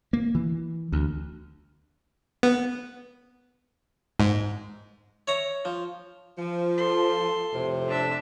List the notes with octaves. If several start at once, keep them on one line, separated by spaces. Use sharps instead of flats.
A#3
E3
D2
B3
G#2
C#5 E5 A#5
F3
F3
A4 C6
F2 A2 C3
D4 E5